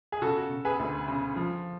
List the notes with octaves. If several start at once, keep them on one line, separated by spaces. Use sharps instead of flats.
G#4
C#3 F#4 A4
F#4
C#3
G#4 B4
D2
C#3
F3